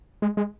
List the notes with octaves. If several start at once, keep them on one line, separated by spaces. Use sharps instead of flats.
G#3
G#3